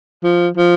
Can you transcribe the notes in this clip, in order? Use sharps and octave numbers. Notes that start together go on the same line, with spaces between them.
F3
F3